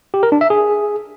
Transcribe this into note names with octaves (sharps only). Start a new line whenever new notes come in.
G4
A#4
D4
E5
G#4